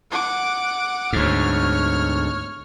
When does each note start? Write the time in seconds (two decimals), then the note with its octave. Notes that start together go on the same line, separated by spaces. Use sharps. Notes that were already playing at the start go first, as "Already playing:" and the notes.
0.11 F#5 D6
1.13 D2 G#2 C#5 F6